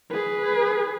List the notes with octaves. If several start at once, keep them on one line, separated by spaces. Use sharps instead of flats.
G#4 B4